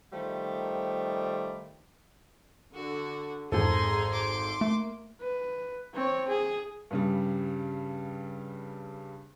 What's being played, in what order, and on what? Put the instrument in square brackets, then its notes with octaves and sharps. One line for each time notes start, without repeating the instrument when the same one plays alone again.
[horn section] D#3 F3 G3 A3
[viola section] D3 [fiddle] F#4
[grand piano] G#1 A4 [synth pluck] F2 A#2 [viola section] G#4 G#5 A#5 [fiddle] C6
[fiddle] C6 D6
[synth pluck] A3 [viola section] A#3
[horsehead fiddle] B4
C4 C#5
G#4
[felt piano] G2 C#3 G3